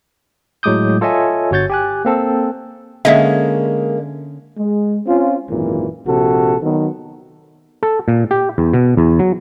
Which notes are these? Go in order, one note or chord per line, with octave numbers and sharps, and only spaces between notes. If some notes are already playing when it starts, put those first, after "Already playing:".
A2 F#3 G#3 D6 D#6 G6
F4 A4 C#5 D#5 E5 G#5
G1 F#4 C#5 G6 A6
G4 G#5 F#6
A#3 C4 A4
D3 G#3 A#3 C#4 D#5 E5
G#3
C4 C#4 F4
G#1 F#2 A#2 E3
A#1 C3 F#4 A4
D#3 F#3 B3
A4
A#2
G4
E2
B2
E2
F#3